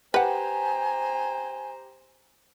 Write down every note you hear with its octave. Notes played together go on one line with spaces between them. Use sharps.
G4 B4 C5 F#5 G#5 A#5